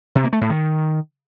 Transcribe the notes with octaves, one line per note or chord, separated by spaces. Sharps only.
C3
A#3
A3
A2
D#3